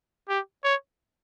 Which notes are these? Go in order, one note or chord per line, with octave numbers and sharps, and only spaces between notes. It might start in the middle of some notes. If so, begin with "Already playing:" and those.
G4
C#5